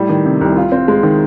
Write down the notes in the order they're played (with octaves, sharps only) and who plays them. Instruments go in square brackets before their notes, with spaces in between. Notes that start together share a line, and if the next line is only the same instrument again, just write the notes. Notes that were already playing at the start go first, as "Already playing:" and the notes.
Already playing: [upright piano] A2 G3
D#3
C3
C2
F4
C4
G#3
D#3